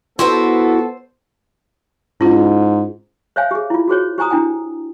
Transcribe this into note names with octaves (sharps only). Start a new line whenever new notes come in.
B3 E4 F#4 A4 B4 C5
G#2 C#4 E4 F4
C5 C#5 E5 F5 G#5
G4 G#4
E4 F4
F#4 G#4 C5 C#5
G4 C5 G#5 A#5 D#6
D4 E4 G5 G#5